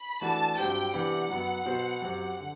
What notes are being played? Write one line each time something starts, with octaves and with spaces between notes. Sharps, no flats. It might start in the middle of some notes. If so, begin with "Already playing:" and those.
Already playing: B5
E3 A3 D4 F#4 B4 A5
G2 F#3 C4 G4 G5
C3 E3 B3 D4 G4 F#5
F#2 F#3 B3
B2 F#3 B3 F#4 C5
F#2 F#3 C4 G4
D3